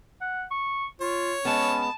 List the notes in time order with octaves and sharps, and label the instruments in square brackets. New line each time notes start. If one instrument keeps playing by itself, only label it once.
[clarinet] F#5
C#6
[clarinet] F4 [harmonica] C#5
[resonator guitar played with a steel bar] G#3 B3 [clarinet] C#4 [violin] A5